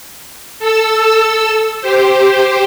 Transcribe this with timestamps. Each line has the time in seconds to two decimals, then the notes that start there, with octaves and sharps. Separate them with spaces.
0.59 A4 E6
1.81 G4 C5